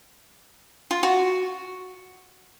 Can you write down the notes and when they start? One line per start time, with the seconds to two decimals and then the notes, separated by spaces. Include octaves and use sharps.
0.91 F4
1.03 F#4